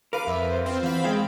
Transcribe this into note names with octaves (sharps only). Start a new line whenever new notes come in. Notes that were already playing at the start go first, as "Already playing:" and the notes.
A#4 B4 F5 D6
F2 E5
C5
C4 F4
E2 C4 F5 B5
G#3 G#4 F5 G5